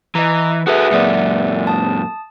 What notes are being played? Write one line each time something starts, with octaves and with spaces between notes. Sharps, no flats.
E3 D#5 A#5
F#4 G#4 A4 B4 E5
F#2 A#2 D5 E5 F#5
A5 D#6